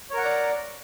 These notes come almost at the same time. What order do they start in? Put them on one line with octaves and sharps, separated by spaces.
C#5 A#4 F#5 A#5 D5